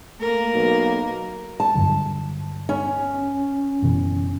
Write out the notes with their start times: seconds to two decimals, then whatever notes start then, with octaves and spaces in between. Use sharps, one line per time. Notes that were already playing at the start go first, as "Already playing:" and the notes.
0.20 A3 A#3 A#4
0.54 B1
1.60 A5
1.75 G2 D3 F#3
2.69 C#4
3.82 F#1 B2 E3